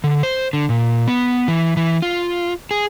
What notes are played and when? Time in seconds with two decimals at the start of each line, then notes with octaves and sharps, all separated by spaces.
0.04 D3
0.23 C5
0.53 D3
0.69 A#2
1.08 B3
1.48 E3
1.77 E3
2.02 F4
2.71 G#4